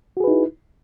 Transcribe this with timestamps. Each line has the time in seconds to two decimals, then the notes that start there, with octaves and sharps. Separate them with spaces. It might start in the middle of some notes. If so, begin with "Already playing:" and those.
0.17 F#4
0.20 G#4
0.24 B4
0.27 D#4
0.31 E4